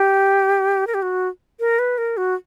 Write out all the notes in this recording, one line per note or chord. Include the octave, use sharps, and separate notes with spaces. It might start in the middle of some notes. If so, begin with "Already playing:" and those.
Already playing: G4
A#4
G4
F#4
A#4
B4
A#4
F#4